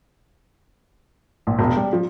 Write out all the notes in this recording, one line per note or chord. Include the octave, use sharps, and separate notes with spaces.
A#1
E1
G3
F3